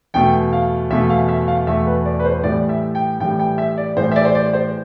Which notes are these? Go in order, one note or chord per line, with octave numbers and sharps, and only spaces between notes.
E2 B2 A3 G5
F5
E2 B2 A3 E5
F5
E5
F5
E2 B2 A3 E5
B4
D5
B4
C5
A2 E3 G3 D5
E5
G5
A2 E3 G3 G5
G5
E5
D5
A2 E3 G3 C5
E5
D5
C5
D5
C5